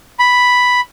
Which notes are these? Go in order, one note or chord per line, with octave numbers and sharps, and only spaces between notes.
B5